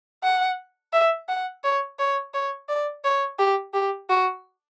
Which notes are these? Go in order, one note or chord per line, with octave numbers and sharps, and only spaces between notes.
F#5
E5
F#5
C#5
C#5
C#5
D5
C#5
G4
G4
F#4